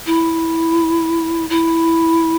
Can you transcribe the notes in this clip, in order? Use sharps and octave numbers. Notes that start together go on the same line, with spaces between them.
E4
E4